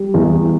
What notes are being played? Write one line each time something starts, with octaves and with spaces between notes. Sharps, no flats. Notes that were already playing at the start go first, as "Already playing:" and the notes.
Already playing: G3
E2